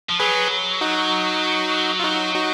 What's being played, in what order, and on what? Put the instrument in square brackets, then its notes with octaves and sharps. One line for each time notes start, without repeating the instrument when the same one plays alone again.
[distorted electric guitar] F3
[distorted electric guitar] F#3 [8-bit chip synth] G#4 B4
[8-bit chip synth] D#4 F#4
F4
D#4 F#4
D#4 F#4